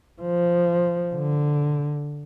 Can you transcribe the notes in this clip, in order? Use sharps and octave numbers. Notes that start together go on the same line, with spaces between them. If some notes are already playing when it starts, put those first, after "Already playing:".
F3
D3